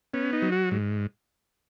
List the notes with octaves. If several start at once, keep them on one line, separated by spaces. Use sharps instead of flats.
B3 C#4
D#4
F#3
F#4
G#2